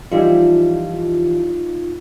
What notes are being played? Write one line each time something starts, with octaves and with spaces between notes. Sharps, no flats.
E3 F3 G3 D#4 F4